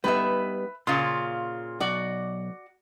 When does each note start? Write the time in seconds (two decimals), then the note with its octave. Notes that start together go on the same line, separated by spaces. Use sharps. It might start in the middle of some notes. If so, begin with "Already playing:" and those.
0.04 G3 B3 D#4 B4 E5
0.87 A#2 C#3 F4 C6
1.80 B1 F#4 D5